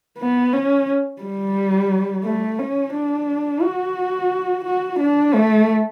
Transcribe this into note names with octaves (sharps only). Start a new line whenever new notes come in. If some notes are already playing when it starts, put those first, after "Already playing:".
B3
C#4
G3
A3
C#4
D4
F#4
F#4
D4
A3